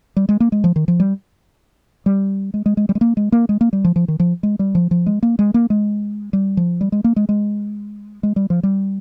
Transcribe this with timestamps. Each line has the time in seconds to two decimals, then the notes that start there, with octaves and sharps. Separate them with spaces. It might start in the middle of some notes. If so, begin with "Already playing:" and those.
0.16 G3
0.29 G#3
0.40 A#3
0.52 G#3
0.64 F3
0.76 D#3
0.88 F3
1.00 G3
2.06 G3
2.54 G#3
2.66 G#3
2.77 G#3
2.89 G3
2.95 G#3
3.01 A#3
3.17 G#3
3.32 A#3
3.49 G#3
3.61 A#3
3.73 G3
3.85 F3
3.96 F3
4.08 D#3
4.20 F3
4.43 G#3
4.59 G3
4.75 F3
4.91 F3
5.06 G#3
5.23 A#3
5.39 G#3
5.54 A#3
5.70 G#3
6.33 G3
6.57 F3
6.81 G3
6.92 G#3
7.04 A#3
7.16 G#3
7.29 G#3
8.23 G#3
8.36 G3
8.50 F3
8.63 G3